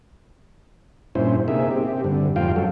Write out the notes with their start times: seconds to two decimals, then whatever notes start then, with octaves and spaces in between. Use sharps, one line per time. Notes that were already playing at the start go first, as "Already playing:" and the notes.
1.15 G2 A#2 C#4 E4 C5
1.48 C3 A#3 D#4 G#4 E5
1.71 C4 G4
2.04 G2 D3
2.36 F2 G#2 F4 F5 G5
2.56 F#2 F#3 A4